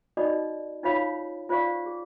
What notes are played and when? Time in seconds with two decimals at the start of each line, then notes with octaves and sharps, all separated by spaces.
0.17 D#4 F#4 A4 D5 D#5 B5
0.83 D#4 F4 C5 C#5 F5 B5
1.49 F4 C5 D5 F5 C#6
1.86 G#4